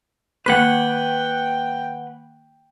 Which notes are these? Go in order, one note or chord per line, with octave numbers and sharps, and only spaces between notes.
D#3 A#3 B4 F#5 G5 F#6